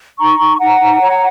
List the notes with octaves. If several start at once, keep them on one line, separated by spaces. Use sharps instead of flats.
D#4 A#5 C#6
D#4
D#4 F#5 A#5
D#4
C#5